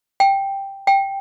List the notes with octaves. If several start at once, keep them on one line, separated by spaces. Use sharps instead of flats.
G5
G5